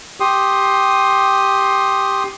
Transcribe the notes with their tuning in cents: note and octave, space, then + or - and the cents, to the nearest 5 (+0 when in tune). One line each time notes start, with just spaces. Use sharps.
G4 +0 C6 +15 D#6 +0